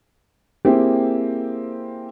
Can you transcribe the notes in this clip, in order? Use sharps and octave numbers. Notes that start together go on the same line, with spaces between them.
A#3 C4 E4 G4 G#4